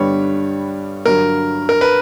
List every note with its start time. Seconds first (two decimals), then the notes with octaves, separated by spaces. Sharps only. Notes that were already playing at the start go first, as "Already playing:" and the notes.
Already playing: G2 D3 G3 B3 C#5
1.05 G2 D3 F#3 A#4
1.69 A#4
1.81 B4